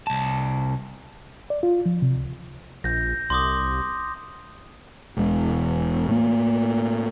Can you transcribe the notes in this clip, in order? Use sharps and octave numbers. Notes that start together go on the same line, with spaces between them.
C2 A5
D5
F4
F3
C3
C#2
A#1 G6 A#6
C2 C6 D6 D#6
E1 E2 G#3
A2 A#3